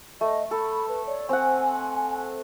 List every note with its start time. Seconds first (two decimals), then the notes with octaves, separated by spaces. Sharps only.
0.21 A3 D#5
0.51 A4 B5
0.88 B4
1.06 C#5 D5
1.29 C4 F#5 G#5